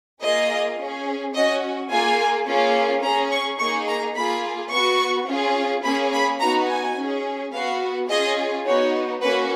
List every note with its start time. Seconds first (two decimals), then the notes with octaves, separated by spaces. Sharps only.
0.22 A#3 F4 G#4 D#5
0.79 C#4 G#4
1.34 C#4 F#4 D#5
1.91 A#3 F4 G#4 G#5
2.48 A#3 C#4 F4 G#4
3.03 C#4 G#4 A#5
3.31 C#6
3.59 A#3 D#4 G#4 C#6
3.88 A#5
4.15 A#3 F4 G#4 B5
4.71 B3 F#4 C#6
5.28 C#4 F4 G#4
5.84 A#3 C#4 G#4 B5
6.13 B5
6.40 B3 D#4 F#4 A#5
6.69 G#5
6.97 C#4 G#4
7.53 B3 F#4 F5
8.09 C#4 F4 G#4 D#5
8.66 B3 D#4 F#4 C#5
9.21 A#3 C#4 F#4 B4